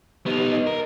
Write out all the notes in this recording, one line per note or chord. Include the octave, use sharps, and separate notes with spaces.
B3 D#4 G4 F7
D#5
A#4